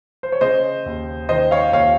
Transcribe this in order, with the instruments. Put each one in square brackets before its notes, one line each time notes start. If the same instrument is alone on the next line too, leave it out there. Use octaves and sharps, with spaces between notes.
[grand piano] C5
C#5
C#3 C5 D#5
D#2
D#3 C5 D#5
C#5 F5
D#2 C#5 F5